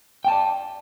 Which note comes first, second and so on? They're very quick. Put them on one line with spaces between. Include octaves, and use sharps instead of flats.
G5 A5 D5